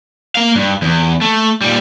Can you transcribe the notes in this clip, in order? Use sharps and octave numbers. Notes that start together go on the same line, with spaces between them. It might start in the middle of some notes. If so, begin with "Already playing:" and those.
A#3 F5
G2
E2
A3
A#2 G3